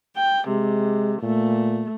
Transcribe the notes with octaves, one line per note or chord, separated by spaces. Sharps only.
G5
C3 G#3
A#2 A3